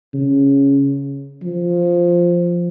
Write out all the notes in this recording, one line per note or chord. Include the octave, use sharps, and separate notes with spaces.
C#3
F3